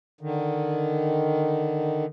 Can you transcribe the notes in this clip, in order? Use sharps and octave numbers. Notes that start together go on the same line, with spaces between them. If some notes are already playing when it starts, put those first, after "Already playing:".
D3 D#3